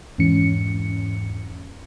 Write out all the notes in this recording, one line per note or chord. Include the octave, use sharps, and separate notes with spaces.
E2 G#2 E3 C#4 C#7